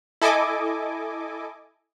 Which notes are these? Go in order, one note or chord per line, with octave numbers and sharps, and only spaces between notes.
E4 A4 D#5 G#5 D6